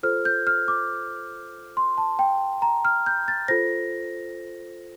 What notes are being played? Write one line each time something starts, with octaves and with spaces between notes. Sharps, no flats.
F4 A4 C5 F6
G6
F6
D6
C6
A5
G5
A#5
F6
G6
A6
F4 A4 C5 A#6